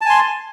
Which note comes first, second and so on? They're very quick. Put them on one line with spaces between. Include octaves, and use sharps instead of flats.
A5 G#5 C6